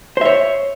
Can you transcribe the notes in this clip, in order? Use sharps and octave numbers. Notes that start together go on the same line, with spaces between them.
C5 C#5 E5